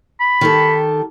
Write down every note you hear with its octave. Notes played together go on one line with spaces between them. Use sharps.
B5
D#3 G4 A4